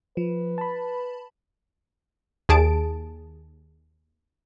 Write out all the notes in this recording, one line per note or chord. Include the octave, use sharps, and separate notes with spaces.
F3 B4
A5 B5
D#2 G#4 A5 D7